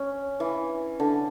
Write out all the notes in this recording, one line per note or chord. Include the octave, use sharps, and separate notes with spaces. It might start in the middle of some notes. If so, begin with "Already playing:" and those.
Already playing: C#4
E3
D3